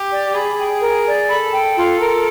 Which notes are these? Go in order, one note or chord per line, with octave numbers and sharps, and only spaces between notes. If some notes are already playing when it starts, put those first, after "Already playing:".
Already playing: G4
D5
G#4 B5
G5
A#4
D5
A4 B5
G5
F4 A4
A#4